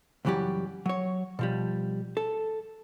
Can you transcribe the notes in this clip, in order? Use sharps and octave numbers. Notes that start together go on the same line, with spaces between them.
C#2 F#2 E3 F#3 G3 G4
F#3 C#5
B2 F3 G3
A4